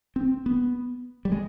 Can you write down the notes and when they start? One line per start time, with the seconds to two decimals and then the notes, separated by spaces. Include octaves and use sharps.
0.16 C4
0.46 B3
1.25 G3
1.32 G#3